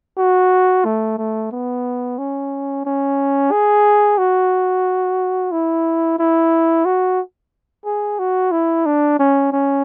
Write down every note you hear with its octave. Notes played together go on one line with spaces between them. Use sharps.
F#4
A3
A3
B3
C#4
C#4
G#4
F#4
E4
E4
F#4
G#4
F#4
E4
D4
C#4
C#4